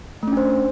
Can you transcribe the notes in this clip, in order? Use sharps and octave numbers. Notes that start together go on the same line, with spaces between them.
A3 C#4 D4 C5